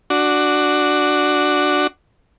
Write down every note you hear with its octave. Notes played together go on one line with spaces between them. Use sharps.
D4 F#4